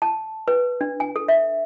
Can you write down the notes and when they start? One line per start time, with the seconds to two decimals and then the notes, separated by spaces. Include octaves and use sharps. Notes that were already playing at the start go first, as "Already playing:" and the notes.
0.02 A5
0.48 B4
0.81 D4
1.00 G#5
1.16 A4
1.28 E5